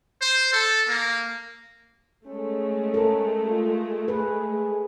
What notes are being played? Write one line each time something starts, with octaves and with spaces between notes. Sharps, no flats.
C5
A4
A#3
G#3 A3 C#4
A4 A#4
F4
G#4 B4